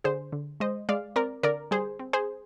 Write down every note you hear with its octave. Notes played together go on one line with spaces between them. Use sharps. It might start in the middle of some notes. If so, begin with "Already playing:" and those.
D3 G#4 C5
D3
G#3 C5 D#5
G#3 D5 F5
C4 A#4 D5
D3 A#4 D5
G3 G#4 C5
C4
G#4 C5